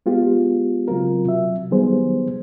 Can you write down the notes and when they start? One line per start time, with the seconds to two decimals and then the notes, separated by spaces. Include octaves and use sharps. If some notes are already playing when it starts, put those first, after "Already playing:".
0.06 G#3 B3 F4 G4
0.88 C#3 F#3 C4 F4 A#4
1.25 C3 F#3 E5
1.71 D#3 F#3 G3 B3 G#4 C5